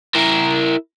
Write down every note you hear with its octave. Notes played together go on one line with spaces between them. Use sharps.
E4 A#4